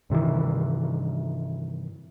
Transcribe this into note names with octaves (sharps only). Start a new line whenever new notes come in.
G2 C3 D#3 E3